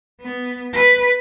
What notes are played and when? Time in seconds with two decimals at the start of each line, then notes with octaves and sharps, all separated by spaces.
0.22 B3
0.73 B4